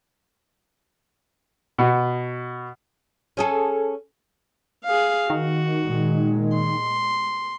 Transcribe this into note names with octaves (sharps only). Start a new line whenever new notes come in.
B2
C#4 G#4 A4
G#4 F5
D#3 F#4
A#2 G#3
C6